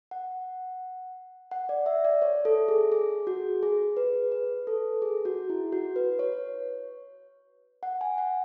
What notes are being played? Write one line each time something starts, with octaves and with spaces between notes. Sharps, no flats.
F#5
F#5
D5
E5
D5
C#5
A4
G#4
G#4
F#4
G#4
B4
B4
A4
G#4
F#4
E4
F#4
B4
C#5
F#5
G#5
F#5